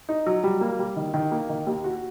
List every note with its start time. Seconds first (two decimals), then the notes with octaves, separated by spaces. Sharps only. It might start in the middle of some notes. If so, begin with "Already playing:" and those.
0.09 D#4
0.26 F#3
0.44 G3
0.61 A#3
0.79 G3
0.96 D#3
1.14 D#3
1.31 A#3
1.49 D#3
1.67 D#2
1.84 F#4